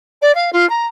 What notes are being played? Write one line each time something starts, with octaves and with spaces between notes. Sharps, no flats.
D5
F5
F4
A#5